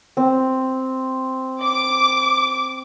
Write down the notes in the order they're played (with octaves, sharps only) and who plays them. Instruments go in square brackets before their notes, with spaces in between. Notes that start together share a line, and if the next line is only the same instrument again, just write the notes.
[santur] C4
[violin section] D6